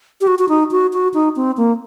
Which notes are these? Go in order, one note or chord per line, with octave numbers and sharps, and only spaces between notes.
G4
F#4
F#4
D#4
F#4
F#4
D#4
C4
A#3